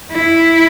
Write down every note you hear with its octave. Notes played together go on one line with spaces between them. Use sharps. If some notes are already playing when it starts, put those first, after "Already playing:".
E4